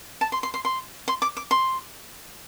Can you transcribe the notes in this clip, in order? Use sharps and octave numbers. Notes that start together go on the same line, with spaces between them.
A5
C6
C6
C6
C6
C6
D6
D6
C6